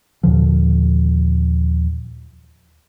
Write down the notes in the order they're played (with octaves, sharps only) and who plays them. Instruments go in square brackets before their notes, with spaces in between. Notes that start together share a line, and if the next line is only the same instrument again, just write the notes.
[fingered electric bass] D#2 A#2 D3 F3